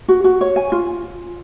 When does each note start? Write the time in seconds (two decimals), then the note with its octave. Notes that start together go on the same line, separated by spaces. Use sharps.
0.08 F#4
0.24 F#4
0.41 C#5
0.56 G#5
0.72 F4